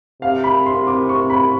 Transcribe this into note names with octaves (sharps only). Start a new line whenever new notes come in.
C3 F5
B5
C6
D6
C#6
B5